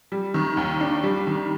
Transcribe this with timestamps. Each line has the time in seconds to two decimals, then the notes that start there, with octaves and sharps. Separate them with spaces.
0.12 G3
0.34 D#3
0.57 D#2
0.81 D4
1.04 G3
1.27 D#3